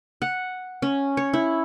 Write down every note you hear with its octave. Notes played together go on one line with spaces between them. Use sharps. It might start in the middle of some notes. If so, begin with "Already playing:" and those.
F#5
C#4
C#5
E4